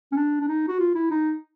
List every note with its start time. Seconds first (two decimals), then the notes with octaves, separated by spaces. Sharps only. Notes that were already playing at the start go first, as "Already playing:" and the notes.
0.12 C#4
0.17 D4
0.41 D4
0.48 D#4
0.68 F#4
0.80 F4
0.95 E4
1.11 D#4